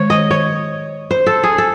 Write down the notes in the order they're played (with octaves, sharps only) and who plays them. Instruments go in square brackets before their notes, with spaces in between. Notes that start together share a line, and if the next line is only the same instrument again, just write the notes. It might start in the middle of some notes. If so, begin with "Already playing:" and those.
Already playing: [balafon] D#3 G#3 [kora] C#5
[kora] D#5
C#5
C5
A4
G#4
A4